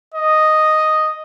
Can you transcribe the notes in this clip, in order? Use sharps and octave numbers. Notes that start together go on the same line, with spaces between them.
D#5